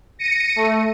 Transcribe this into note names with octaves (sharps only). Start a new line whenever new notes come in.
A#6 C#7 D#7
A3